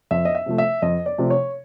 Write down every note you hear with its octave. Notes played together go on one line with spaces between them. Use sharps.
F2 E5
D#5
E5
C3 F3 A3
E5
F2 D#5
D5
C3 F3 A3
C#5